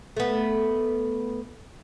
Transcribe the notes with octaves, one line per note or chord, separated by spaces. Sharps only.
A3 B3